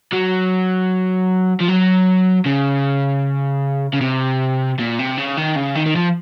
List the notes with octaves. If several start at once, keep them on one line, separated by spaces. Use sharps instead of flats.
F#3
F3
F#3
C#3
C#3
C3
A#2
C3
C#3
D#3
C#3
D#3
D#3
F3